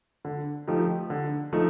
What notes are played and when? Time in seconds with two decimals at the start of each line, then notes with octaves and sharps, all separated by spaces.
0.25 D3
0.67 F3 A3 D#4 G4
1.10 D3
1.53 F3 A3 D#4